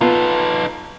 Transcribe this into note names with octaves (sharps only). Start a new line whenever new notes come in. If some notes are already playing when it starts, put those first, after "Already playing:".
B3 D#4 F4 A4